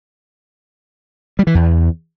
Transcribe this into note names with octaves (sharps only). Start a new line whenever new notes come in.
G3
E3
E2